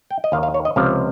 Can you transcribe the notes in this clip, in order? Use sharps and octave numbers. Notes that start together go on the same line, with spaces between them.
G5
D#5
D#2 D#3 F5
F5
C#5
D#5
C#2 C3 F3 F5